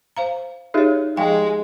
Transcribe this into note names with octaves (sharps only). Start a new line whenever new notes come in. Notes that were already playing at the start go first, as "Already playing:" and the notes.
C5 F5 A#5
D#4 F4 G4 G#4 C#5
F3 G#3 F5 G5